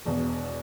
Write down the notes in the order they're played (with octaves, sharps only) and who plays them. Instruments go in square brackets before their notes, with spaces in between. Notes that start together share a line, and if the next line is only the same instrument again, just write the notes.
[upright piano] E1 E2 B2